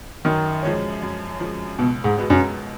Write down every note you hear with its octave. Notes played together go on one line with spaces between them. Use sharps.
F#2 D#3
F3 G#3 C#4
F#2
F3 G#3 C#4
C#2 B2
G#2
B2 G#3 B3
F#2